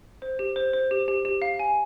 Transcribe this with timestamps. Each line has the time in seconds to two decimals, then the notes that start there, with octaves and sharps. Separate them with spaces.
0.22 C5
0.39 G4
0.56 C5
0.73 C5
0.91 G4
1.08 G4
1.25 G4
1.42 F5
1.59 G#5